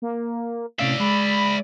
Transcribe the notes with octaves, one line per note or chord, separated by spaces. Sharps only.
A#3
A2 C3 C#4 D5 E5 F5
G#3 B5